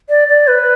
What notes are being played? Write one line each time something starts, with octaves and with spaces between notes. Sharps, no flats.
D5
D5
B4